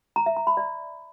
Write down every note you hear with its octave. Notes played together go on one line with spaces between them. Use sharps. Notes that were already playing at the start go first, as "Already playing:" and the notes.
A#5
E5
A#5
B5
D5